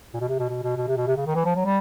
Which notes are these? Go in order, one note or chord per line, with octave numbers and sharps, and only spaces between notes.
A#2
B2
C3
B2
B2
B2
B2
C3
B2
C3
C#3
D#3
E3
F3
F#3
G3